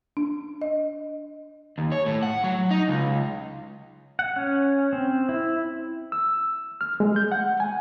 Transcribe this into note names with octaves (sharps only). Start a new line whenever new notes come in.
D4
D#5
D#2
C#5
A2
F#5
F#3
D#4
C#2
F#5
C#4
C4
E4
E6
F6
G#3
G6
F#5
G#5